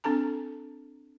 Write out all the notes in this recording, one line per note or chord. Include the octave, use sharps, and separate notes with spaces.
C4 D4 A4 A5 A#5